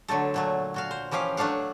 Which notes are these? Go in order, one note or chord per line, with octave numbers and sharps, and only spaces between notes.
D3 F#3 A3 A4
A#2 F#3 A3
A#2 F#4 F5
C5
E3 F3 C#4 G4 F5
F#3 A3 D4 F5 F#5